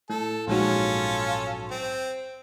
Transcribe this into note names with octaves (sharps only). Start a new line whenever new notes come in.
A2 A4
A#1 G#2 F#3 C#4 F4 A4
C4